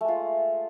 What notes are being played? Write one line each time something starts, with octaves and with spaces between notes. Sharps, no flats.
G#3 A3 F4